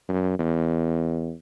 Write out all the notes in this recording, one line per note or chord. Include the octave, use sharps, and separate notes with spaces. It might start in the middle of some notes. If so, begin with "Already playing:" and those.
F#2
E2